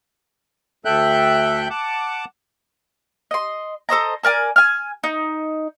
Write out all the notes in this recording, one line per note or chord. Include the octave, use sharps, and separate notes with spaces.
D2 A4 E5 G5 F#6 G6
F#5 A5 D6
D#5 C6
A4 C5 D#5 A#5
A4 A#4 D5 G#5
G#5 F6
D#4